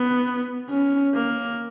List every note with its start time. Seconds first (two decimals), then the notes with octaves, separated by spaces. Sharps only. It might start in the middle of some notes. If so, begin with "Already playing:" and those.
Already playing: B3
0.69 C#4
1.14 A#3